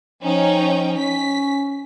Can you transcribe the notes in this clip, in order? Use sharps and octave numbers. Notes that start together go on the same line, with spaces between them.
F3 C#4 D#4 G5
C#4 B6